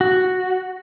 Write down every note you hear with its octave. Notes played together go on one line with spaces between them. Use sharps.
F#4